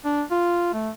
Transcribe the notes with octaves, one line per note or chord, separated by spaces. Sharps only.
D4
F4
A3